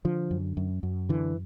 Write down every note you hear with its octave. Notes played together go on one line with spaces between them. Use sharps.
D3 F3
F#2
F#2
F#2
D3 E3